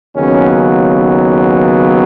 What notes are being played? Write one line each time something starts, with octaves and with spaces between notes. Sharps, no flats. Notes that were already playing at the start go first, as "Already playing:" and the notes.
D#2 C#3 F#3 B3 C#4